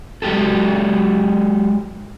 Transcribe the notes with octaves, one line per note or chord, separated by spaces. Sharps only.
F#3 G#3 F#4 G4 A4